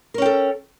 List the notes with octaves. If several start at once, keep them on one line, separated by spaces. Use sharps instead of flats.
C#4 A4 A#4 G5